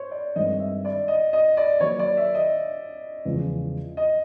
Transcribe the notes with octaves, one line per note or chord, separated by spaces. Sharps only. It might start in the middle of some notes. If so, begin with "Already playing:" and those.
Already playing: C5 C#5
D5
G2 D#3 G#3 C4 D#5
E5
D5
D#5
D#5
D5
D#3 F#3 A#3 C#5
D5
E5
D#5
E2 C#3 F3 G#3
D#5